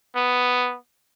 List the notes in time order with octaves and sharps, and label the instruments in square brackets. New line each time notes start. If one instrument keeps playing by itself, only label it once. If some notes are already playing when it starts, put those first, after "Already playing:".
[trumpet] B3